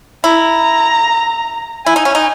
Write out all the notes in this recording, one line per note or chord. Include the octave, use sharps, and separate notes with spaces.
E4 A#5
E4 G#5
D#4
C#4
D#4